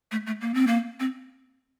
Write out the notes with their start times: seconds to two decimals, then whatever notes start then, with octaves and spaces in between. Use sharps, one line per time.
0.12 A3
0.27 A3
0.41 A#3
0.54 C4
0.67 A#3
1.00 C4